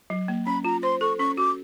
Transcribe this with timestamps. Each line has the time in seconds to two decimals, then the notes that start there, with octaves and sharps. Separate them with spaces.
0.10 F#3
0.28 A#3
0.46 C#4 B5
0.64 F4 A#5
0.83 C5 C6
1.01 A4 C#6
1.19 C#4 C#6
1.37 F#4 D6